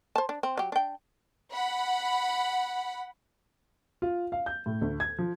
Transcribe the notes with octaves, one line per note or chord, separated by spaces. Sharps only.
C5 A5
D4
C4
F#3 G4
D4 G5
F#5 B5
F4
F5
G6
A2
D2
G#6
F3